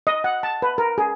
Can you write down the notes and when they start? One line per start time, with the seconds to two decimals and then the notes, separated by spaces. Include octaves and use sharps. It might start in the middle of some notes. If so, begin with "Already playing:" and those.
0.07 D#5
0.24 F#5
0.43 A5
0.62 B4
0.78 A#4
0.98 G#4